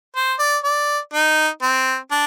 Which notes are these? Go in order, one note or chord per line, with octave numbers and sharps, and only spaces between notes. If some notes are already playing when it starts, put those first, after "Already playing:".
C5
D5
D5
D#4
C4
D4